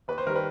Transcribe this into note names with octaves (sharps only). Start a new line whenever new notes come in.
D#2 B4
C5
D#3 G3 A#4
B4